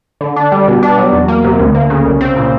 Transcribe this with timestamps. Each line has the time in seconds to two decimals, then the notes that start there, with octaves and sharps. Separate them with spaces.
0.21 D3
0.36 D4
0.52 G3
0.68 B2
0.83 D4
0.98 F#3
1.13 E2
1.28 A#3
1.44 C3
1.59 D2
1.75 A#3
1.90 C#3
2.05 C2
2.21 C4
2.36 A#2